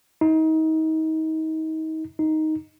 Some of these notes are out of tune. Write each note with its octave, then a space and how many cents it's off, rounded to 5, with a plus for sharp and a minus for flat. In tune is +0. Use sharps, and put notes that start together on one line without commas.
D#4 +30
D#4 +5